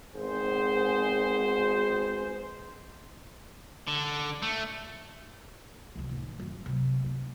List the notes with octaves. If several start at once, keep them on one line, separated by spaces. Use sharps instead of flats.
G#1 B3 G#4 C5
D3
A3
C2 F3
A2 D#3
F#2
C3 F#3
A#3 D4